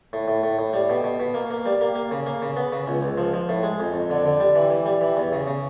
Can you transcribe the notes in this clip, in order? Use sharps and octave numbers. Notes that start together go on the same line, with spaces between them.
A2
A2
A2
A2
G3
B2
B2
B2
A#3
A#3
G3
A#3
A#3
C#3
A#3
C#3
B3
C#3
C#2
C#2
F3
F3
A2
G#3
F2
F2
D3
D3
G3
E3
E3
G3
E3
E2
C#3
C#3